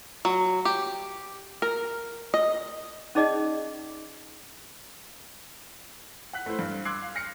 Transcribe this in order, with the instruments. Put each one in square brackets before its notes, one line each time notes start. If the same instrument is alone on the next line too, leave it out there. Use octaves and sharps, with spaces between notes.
[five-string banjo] F#3
G4
A#4
D#5
[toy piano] C#4 D#4 G#4 D5 D#5
[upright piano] F#5 F#6 B6
A3 E4 C5
G2
C6 D6 E6 F#6 G#6 C7
F5
F6 A#6 C7 C#7